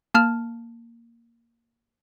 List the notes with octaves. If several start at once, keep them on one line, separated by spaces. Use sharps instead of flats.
A#3 A5 F6